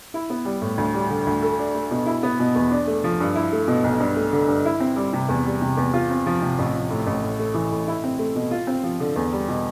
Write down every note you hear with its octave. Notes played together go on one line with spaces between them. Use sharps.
E4
B3
G3
A2
D2
G3
D3
D2
A4
D4
A3
B2
E4
B3
B2
E2
D4
A3
F3
G2
E4
A3
B2
B1
G2
A3
D3
G2
E4
C4
G3
C3
E2
G3
C3
E2
F4
C4
F3
C3
A1
F3
A2
A1
A2
A3
E3
A2
E4
C4
A3
B2
F4
C4
F3
D3
E2
G3
B2